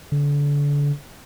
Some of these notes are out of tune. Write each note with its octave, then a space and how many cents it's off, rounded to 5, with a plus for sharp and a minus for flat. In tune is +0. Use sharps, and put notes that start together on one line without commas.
D3 -30